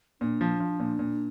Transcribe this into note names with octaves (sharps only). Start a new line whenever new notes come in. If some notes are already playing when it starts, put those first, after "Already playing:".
A#2 D4
F3
F3
A#2
A#2